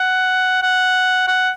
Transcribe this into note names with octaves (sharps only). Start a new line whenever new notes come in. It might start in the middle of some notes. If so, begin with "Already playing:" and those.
Already playing: F#5
F#5
F#5